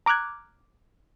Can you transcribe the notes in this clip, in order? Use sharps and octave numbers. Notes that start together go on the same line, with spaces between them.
A#5 D6 F6 F#6 G#6